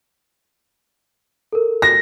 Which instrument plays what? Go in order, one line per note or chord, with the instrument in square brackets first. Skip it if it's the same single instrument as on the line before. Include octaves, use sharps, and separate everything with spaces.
[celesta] A4 A#4
[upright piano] A#6